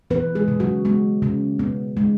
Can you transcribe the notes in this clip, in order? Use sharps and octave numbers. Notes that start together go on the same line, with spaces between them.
E3 B3 B4
G#3 G#4
C#3
F#3 F#4
G#3 B3
C#3
G#3 B3
G#3